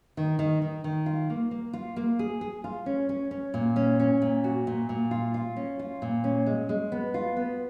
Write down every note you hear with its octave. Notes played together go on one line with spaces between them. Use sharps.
D#3
D#3
D#3
D#3
F4
A#3
A#3
F4
A#3
G#4
G#4
F4
C#4
C#4
C#4
A#2
C#4
C#4
A#2
F#4
A#2
A#2
F4
F4
C#4
F4
A#2
C#4
G#3
G#3
B3
F4
B3